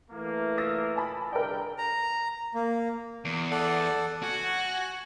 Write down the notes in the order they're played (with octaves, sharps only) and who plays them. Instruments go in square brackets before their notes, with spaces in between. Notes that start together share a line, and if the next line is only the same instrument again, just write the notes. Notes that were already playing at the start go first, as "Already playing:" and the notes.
[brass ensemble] E3 A3 A#3
[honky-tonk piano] D#6 E6 A#6
G#5 A5 B5
[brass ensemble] G2 D3 G5 [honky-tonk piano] A#4 D5
[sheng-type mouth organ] A#5
A#3
[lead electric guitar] E2
[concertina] A4 D5 F#5
[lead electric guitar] F#4 [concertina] F#5 G#5